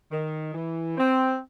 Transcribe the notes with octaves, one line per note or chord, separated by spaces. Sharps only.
D#3
E3
C4